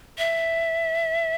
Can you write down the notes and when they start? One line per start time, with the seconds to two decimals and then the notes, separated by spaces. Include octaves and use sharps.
0.18 E5